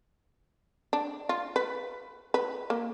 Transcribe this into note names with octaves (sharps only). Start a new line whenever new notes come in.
D4
F4
B4
B4
A#3